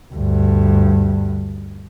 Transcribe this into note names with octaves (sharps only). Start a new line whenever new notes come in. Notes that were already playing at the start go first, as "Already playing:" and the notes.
D2 G2